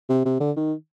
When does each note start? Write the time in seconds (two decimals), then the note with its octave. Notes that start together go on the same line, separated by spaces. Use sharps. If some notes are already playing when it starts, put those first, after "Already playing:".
0.10 C3
0.25 C3
0.40 D3
0.57 D#3